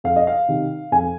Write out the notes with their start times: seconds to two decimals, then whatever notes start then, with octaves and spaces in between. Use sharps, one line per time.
0.04 F2 F5
0.16 D#5
0.27 F5
0.49 C3 D#3
0.92 F2 G#5